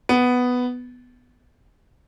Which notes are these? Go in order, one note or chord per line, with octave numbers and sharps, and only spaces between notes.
B3